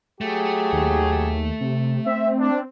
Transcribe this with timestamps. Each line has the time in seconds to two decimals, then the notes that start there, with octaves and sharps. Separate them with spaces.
0.21 F#3 A3 G4 G#4
0.72 D#2
1.61 C3
2.06 C4 E5
2.39 D4